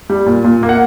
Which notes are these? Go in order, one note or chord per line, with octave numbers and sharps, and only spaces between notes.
G3
A#2
A#2
A#3
F#5